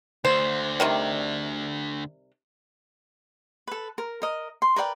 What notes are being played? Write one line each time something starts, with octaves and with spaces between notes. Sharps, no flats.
D2 D3 C5
C3 D#3 G3
A4 B4
A#4
A#4 D#5
C6
A#4 B4 D5 G5